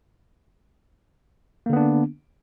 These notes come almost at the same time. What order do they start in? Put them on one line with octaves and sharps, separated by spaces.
A#3 D3 B3 D4